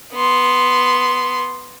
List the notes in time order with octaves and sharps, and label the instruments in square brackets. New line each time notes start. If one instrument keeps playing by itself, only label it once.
[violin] B3 C6